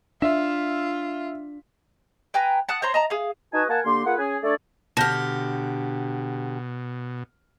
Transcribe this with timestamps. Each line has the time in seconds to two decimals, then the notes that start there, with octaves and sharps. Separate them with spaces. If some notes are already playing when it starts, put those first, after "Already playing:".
0.22 D4 F4 E5
2.34 B4 G5 G#5 A#5
2.69 F#5 A5 D#6 F#6
2.82 C5 C#5 A#5 C6
2.94 D#5 A5 A#5
3.10 G#4 F5
3.54 D#4 F#4 B4 D#5 G#5 A5
3.69 A#3 A#4 F#5 G#5 A5
3.85 D3 A#3 G4 C6
4.05 A#3 F4 G#4 B4 F#5
4.18 C#4 G#4 G#5
4.43 A3 D4 A4 C#5 D5
4.97 B2 D3 G4 A5 F6 G6 A#6